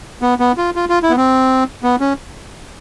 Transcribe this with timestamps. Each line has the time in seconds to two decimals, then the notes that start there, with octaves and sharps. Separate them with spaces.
0.22 B3
0.40 B3
0.58 F4
0.76 F4
0.89 F4
1.03 E4
1.10 B3
1.17 C4
1.83 B3
2.01 C#4